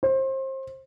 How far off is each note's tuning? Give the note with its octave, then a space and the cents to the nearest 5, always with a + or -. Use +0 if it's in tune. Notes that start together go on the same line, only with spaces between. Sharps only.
C5 +30